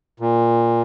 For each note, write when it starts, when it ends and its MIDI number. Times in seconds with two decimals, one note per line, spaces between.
0.20 0.82 46